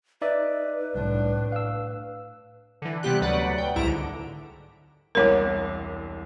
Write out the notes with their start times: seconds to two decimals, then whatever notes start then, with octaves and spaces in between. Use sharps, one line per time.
0.22 D#4 B4 D5 E5
0.95 C2 A2 D4
1.52 F5 E6
2.82 D3 E3
3.03 C3 G3 B3 G4 F#6
3.21 D2 F#3 B4 D5 F#5
3.58 D2 G5
3.76 C2 G#2 E4 A#5 D7
3.87 D3
5.15 E1 C2 A#4 C#5 D6